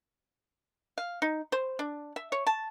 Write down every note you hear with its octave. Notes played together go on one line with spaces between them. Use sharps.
F5
D#4
C5
D4
E5
C#5
A5